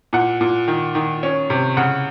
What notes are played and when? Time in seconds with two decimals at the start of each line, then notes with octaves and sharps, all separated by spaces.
0.13 A#2 F#5
0.41 A#2
0.68 D#3
0.95 D#3
1.23 C#4
1.50 C3
1.77 C#3 F#5